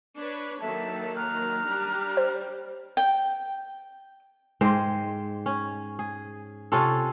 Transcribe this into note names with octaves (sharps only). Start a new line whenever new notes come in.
D4 B4 C#5
D#3 F#3 A#3 A4 E5 A5
A#5 F6 F#6
G3 D4 G4
C5
G5
G#2 G#3 C5 G5
C#4
G#4
C3 C#4 F4 A4